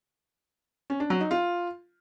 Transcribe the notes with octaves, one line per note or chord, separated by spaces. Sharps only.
C#4
D4
F#3
D#4
F4